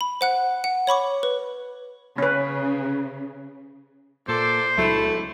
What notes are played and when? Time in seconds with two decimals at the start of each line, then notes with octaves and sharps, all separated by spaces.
0.01 B5
0.21 C5 F#5 F#6
0.64 F#5
0.87 C#5 B5 C#6 D6
1.23 B4
2.18 C#3 C#4 B4
4.28 A#2 A4 C5 D5
4.77 C#2 F#3 A3 E4